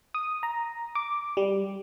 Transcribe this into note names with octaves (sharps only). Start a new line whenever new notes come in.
D#6
A#5
D6
G3